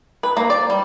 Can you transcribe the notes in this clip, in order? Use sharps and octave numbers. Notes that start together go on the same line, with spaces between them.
B4
A#3
D5
G3